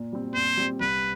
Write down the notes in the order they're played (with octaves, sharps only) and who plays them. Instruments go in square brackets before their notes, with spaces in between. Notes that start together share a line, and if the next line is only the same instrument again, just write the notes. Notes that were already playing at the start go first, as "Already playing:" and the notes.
Already playing: [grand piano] A#2
G3 C4
[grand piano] A#2 [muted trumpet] C5
[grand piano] G3 C4
[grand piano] C2 [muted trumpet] B4